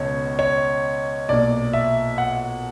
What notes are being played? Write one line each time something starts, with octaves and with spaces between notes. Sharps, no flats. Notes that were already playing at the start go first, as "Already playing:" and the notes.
Already playing: C#2 B2 C#5
C#5
B1 A#2 D5
E5
F#5